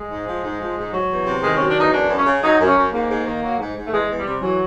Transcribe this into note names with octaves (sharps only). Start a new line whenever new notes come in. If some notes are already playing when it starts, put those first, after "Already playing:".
Already playing: G#3
G#2
F3
G#2
F3
G#2
F#3
E2
C3
D#3 G#3
C#4
F#3
D4
E2 D#4
F#2 D4
F#2
C#4
C#3
F#3 D#4
F#2
C#4
F#2
G#2 A#3
G#2
D#3
F#3
G#2
G#2
A3
E2 G#3
E2
G3
C3
E3 F#3